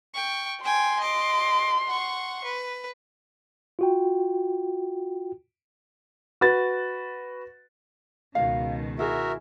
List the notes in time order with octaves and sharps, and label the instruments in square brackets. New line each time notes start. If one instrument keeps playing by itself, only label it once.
[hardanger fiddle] G5 C#6
[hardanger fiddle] G5 G#5 [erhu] C6
[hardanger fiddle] D#5 D6
F#5 C#6
B4
[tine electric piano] F4 F#4 G5
[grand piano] F#4 B4 A6
[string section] C#2 B2 D#3 [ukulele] F5
[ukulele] E4 G#4 [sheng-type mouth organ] F#4 A#4 E5